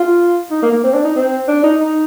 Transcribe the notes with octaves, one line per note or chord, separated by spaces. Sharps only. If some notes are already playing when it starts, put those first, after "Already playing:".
Already playing: F4
D#4
A#3
A#3
C4
D4
D#4
C4
D4
D#4
D#4